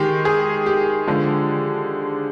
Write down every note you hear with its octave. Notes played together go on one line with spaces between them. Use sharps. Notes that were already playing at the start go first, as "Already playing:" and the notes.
Already playing: D#3 G#3 G4
G#4
G4
D3 F3 G#3